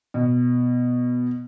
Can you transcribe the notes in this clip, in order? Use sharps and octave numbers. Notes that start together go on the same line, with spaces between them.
B2